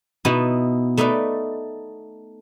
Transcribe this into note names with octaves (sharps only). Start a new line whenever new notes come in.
B2 B3 D#4 E4
A3 D#4 A4 B4 D5